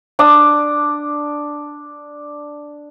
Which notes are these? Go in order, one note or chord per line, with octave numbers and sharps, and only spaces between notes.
D4 D6 D#6